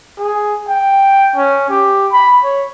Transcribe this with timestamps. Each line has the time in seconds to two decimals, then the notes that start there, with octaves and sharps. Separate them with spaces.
0.19 G#4
0.69 G5
1.36 C#4
1.70 G4
2.12 B5
2.43 C#5